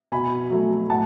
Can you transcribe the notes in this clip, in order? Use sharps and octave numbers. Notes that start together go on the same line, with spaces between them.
B2 G#5 B5
F#3 A3
A2 F#5 A5